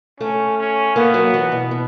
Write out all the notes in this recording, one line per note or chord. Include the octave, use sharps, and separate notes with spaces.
A3 C#4
C#4
A#3 B3
F#3
E3
B2
B2